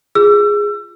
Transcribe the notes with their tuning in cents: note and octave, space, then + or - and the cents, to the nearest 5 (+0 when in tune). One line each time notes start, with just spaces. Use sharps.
F4 +0 G#4 -10 E6 +30